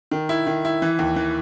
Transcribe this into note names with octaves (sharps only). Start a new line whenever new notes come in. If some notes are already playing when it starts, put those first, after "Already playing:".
D#3
E4
D#3
E4
E3
D#2
E3